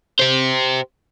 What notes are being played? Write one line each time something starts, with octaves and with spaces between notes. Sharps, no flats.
G4 C5